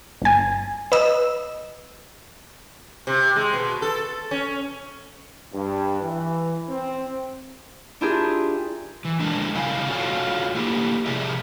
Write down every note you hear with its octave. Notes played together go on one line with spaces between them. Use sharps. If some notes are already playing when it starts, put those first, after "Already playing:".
G1 G#5
B4 D#5 E6
C3
G#3
B2
A4
C#4
G2
E3
C4
D4 E4 F4 G4 G#4 A#4
E3
D3 F3 G#3 D4 E4 A#4
C#3 C4 E4 F5 G#5
F4 F#4 A4 C#5 F5 F#5
A3 A#3 E4 G4
C3 F3 G#4 D5 E5